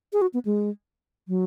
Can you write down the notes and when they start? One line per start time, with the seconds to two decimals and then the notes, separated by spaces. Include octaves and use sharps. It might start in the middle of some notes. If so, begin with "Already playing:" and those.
0.13 G#4
0.22 F#4
0.34 B3
0.45 G#3
1.28 F#3